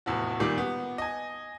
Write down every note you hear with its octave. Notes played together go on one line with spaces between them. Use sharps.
F1 E2 A2 F3 F#4
A#2 D#3 G3 D6
B3
D#5 G#5